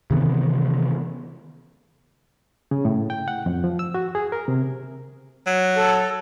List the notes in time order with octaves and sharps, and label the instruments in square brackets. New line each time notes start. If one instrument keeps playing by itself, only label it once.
[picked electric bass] C3 D#3 E3 B3
[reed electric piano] C#3
A2
G5
F#5
F2
F3
E6
F#4
G#4
A#4
C3
[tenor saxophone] F#3
[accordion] A4